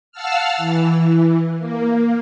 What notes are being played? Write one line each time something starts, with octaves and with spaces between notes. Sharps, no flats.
F5 F#5 A5 E6 F6
E3
A#3